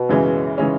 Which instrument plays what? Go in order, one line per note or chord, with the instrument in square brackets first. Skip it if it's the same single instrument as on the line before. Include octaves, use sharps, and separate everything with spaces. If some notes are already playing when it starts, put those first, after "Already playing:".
Already playing: [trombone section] B2
[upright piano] F#2 C#3 E3 G#3 C#4
C#3 E3 G#3 C#4